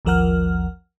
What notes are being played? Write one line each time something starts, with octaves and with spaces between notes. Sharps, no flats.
A1 D#2 F3 A#4 F#5 F6